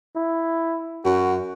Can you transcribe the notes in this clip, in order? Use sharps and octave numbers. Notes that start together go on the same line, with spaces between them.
E4
F#2 F#4